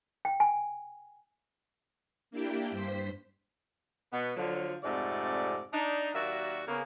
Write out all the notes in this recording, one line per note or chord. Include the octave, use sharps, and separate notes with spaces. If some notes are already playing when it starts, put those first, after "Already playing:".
G5
G#5
A#3 D4 E4 G4 G5
G2 C5 B6
B2 B3
D3 F3 F#3
F2 G#2 C3 A3 D5
D4 D#4
D#2 F#3 A#3 F#4 D5 E5
C#3 A#3 B3